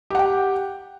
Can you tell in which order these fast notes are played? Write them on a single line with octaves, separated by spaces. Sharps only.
G4 F#5 G5